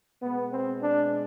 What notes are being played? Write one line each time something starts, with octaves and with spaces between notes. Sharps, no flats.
B2 G#3 B3
C4
D4